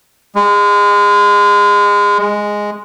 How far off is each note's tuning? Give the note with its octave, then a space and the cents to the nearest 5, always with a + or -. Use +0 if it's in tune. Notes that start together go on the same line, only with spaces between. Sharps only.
G#3 -25
G#3 -5